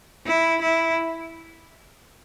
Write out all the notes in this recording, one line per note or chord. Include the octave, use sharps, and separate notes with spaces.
E4
E4